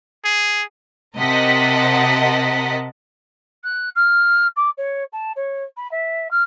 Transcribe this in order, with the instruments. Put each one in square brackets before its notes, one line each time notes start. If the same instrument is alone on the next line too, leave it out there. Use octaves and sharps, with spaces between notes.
[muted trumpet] G#4
[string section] C3 A#4 D#5 F#5 A5 B6
[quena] F#6
F6
D6
C#5
A5
C#5
B5
E5
F6